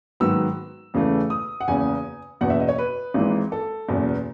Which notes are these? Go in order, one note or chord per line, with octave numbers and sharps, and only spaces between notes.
G#2 D#3 F#3 B3 E6
E2 C#3 E3 A3
D#6
F#5
F#1 E2 C#3 G#5
F#1 E2 B2 F#5
E5
D#5
C#5
B4
G#1 G#2 E3 G#3
A4
F#1 E2 B2